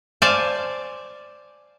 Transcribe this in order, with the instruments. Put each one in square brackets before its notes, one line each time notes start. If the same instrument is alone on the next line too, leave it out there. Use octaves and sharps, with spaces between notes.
[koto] C5 D5 F5 G#5 A5